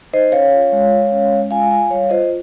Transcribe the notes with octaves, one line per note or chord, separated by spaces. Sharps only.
D#4 C5 D#5
C#4 C#5 F5
F4
G#3
G#3
C#4
G#3
F4 F5 G#5
F4 F5 G#5
G3 C#5 F5
F4 C5 D#5